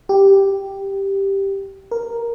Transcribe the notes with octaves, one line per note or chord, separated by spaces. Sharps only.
G4
A#4